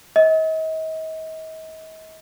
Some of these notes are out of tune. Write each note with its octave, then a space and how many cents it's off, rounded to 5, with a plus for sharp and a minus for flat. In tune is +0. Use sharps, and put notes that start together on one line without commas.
D#5 +40